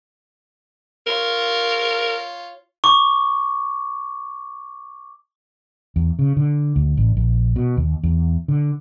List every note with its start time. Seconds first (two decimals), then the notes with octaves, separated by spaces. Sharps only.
1.07 F4 A#4 C#5
2.84 C#6 D6
5.96 E2
6.19 C#3
6.37 D3
6.76 D2
6.97 A1
7.17 A#1
7.56 B2
7.77 D#2
8.03 E2
8.48 D3